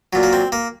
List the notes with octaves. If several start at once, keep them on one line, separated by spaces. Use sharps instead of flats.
A#2 F#3
A#3
C4
A#3